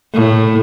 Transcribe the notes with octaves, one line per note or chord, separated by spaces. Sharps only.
A2